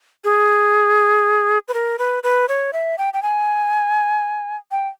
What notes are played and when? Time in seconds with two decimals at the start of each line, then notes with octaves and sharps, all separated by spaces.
0.24 G#4
1.68 B4
1.74 A#4
1.99 B4
2.23 B4
2.49 C#5
2.73 E5
2.98 G5
3.14 G5
3.22 G#5
4.71 G5